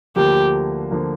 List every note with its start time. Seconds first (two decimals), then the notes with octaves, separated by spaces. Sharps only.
0.16 D2 D3 F3 A#3 G4
0.91 D3 F3 A#3